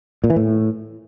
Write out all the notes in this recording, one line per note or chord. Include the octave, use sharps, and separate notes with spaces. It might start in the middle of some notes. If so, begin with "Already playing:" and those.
A#2
E3
A2